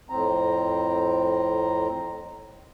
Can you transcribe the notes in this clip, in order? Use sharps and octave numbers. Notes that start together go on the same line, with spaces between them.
F2 A2 C4 A#5